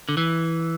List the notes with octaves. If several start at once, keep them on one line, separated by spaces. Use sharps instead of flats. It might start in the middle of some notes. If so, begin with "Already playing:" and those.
D3
E3